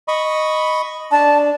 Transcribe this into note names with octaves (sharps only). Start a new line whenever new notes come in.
D#5 B5 C#6
D4 A5